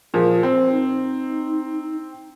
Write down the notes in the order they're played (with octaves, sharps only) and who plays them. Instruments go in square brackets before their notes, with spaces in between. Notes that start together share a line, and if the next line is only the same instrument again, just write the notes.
[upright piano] A#2 F3 [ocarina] G#4
[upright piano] C4 [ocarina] C5
[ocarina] D#4